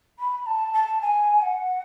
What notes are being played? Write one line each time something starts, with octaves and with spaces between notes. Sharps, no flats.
B5
A5
A5
G#5
F#5